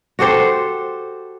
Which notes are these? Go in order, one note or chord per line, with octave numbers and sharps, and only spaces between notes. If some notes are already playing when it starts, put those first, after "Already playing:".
F#4 G4 A4 C5